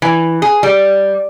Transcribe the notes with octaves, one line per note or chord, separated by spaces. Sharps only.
E3
G#4
G3